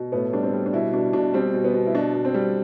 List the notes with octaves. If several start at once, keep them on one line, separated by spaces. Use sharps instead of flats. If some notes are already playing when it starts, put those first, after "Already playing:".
Already playing: B2
A2 B3
G3 D4
C4
G3
D4
B2 E4
B2 D4
B2 D4
G3 C4
B2
B3
B2
E4
B2 D4
B2
C4
G3